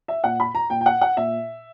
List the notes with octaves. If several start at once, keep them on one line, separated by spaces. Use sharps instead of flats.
E5
A#2 F#5
B5
A#5
A#2 G5
G5
F#5
F#5
A#2 E5